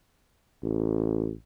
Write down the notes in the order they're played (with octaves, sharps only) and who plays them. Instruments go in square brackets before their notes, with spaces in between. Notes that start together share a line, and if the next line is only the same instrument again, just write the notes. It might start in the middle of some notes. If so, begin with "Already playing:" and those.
[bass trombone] A1